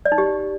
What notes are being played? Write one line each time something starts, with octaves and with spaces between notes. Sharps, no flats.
D5
D#4
G4